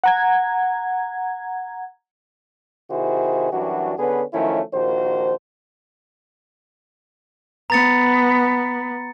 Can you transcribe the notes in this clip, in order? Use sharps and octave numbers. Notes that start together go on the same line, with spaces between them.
F#5 A#5 G#6
C3 D#3 E4 F#4 G#4 C5
F#2 E3 G3 D4 F#4
D3 B3 C#4 G#4 B4
D#3 F3 F#3 A3 C#4 E4
A#1 D#3 F3 F#4 C5
B3 A#5 A6 C#7